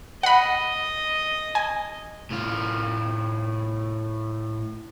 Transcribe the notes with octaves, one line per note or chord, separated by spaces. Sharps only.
D#5 F#5 B5
G#5
A2 F4